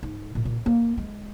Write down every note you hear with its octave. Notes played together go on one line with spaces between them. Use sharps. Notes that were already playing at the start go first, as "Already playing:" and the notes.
G#2
A#2
A#2
A#3
G#3